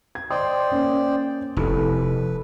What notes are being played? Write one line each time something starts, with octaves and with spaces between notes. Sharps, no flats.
G#6
C5 D5 D#5 G5 C6 D#6
A#3 C#4
F1 E4 A4 B4